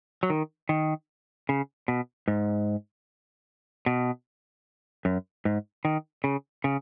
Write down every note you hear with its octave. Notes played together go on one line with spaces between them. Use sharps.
F#3
D#3
D#3
C#3
B2
G#2
B2
F#2
G#2
D#3
C#3
C#3